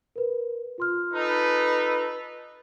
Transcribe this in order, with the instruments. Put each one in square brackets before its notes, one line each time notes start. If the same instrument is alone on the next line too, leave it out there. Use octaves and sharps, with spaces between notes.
[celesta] A#4 B4
F4 C6 F6
[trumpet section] D#4 A4 B4